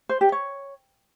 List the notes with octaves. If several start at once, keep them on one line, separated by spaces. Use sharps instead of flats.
C5
G4
C#5